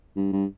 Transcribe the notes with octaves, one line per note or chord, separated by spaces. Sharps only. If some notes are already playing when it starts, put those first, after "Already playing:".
G2
G2